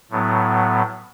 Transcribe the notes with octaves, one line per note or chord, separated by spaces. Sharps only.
A2 F#3 B3